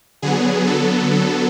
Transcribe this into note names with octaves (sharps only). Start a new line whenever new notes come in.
D3 F#3 B3 G#4
A4
A4